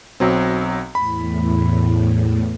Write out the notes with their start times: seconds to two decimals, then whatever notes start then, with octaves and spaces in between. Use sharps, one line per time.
0.20 B1 F#3 C4
0.95 E2 A2 B5